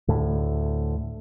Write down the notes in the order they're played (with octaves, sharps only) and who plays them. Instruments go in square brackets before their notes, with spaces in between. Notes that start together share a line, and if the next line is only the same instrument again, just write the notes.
[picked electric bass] D2 A2